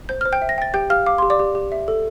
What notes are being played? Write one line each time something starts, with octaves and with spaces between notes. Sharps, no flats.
C5 G6
C5 F6
G5 G6
E5
A#6
G5 A6
G4 G5 G6
G4 F5 F6
F5 D6
G4 C6
D5 D6
G4
G4
E5
A4